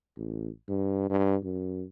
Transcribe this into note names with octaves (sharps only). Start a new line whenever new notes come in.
A1
G2
G2
F#2